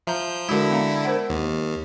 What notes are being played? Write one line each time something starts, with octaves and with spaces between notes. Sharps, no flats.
F3 E5 A#5 G6
D3 G#3 E4 F#4 A#4
B3 F5 A#5
A#4 C5 F#5
D#2